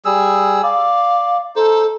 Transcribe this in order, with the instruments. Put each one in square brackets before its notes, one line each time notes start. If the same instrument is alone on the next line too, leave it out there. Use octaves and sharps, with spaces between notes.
[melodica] G3 G#4 E6
[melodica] D5 [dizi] F5
[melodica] D#4 C5 [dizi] A4